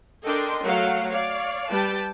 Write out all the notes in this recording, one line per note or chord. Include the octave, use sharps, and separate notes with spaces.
D4 A4 A#4 D#5 G5 C6
F#3 A3 F5 F#5
C#5 D5 F5
G3 B4 G5 A5